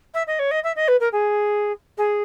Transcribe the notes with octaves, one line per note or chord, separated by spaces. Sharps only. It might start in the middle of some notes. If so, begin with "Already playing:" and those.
E5
D#5
C#5
D#5
E5
D#5
B4
A#4
G#4
G#4